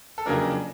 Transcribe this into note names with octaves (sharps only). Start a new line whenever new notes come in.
A4
F2 C#3 F#3 A#3 D4 A#4